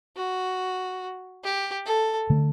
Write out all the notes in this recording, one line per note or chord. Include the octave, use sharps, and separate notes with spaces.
F#4
G4
A4
D3 A3